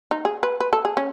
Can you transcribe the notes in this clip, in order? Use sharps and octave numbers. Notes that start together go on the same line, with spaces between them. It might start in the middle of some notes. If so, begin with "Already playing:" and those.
D#4
G#4
B4
B4
A4
G#4
C#4